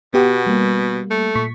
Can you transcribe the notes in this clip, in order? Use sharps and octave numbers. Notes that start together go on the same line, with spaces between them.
B2 B3 G4 F#5
G3 A#3
A3
A#2 C#6 B6